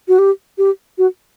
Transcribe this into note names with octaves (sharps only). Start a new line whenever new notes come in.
F#4
G4
G4
F#4